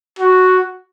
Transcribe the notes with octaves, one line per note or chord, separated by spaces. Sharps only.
F#4